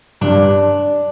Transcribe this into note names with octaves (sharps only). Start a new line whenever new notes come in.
G2 D4